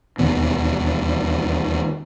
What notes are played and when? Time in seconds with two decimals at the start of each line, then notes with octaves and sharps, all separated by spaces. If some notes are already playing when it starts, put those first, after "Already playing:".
0.18 E1 D#2 B2